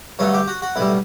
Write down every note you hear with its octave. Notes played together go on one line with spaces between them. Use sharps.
G2 D3 F#3 A3 C#5
G4
F#4
F#4
B1 A2 G3 E4